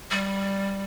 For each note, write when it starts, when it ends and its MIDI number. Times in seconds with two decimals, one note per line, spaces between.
0.11 0.84 55